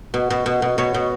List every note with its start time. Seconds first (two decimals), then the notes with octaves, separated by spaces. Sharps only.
0.14 B2
0.30 B2
0.46 B2
0.62 B2
0.78 B2 C#5
0.94 B2